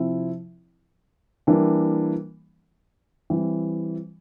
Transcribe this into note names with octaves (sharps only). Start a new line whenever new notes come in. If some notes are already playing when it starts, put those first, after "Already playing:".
Already playing: C3 F3 C4 E4
E3 G3 A#3 D4
E3 G3 C4